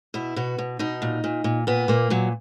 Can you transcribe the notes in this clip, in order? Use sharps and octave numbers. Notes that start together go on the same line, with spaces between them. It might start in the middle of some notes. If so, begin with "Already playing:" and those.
B2 E4
B2 F#4
B2
B2 D#4
A#2
A#2
A#2
A#2 B3
A#2 A#3
A#2 F#3